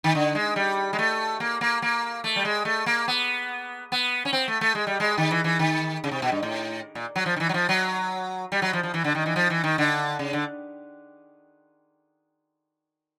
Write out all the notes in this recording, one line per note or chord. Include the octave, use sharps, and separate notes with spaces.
D#3
D3
G#3
G3
G#3
A3
A#3
A#3
A#3
A3
G3
G#3
A3
A#3
B3
B3
C#4
C4
A3
A3
G#3
G3
G#3
D#3
E3
E3
D#3
C#3
C3
B2
G2
A2
A#2
F#3
F3
D#3
E3
F#3
F3
F#3
G3
F#3
F3
F3
E3
D3
D#3
E3
F3
E3
D#3
D3
C#3
D3